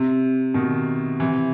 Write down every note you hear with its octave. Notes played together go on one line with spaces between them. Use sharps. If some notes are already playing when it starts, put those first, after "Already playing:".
Already playing: C3
B2 D#3
C3 E3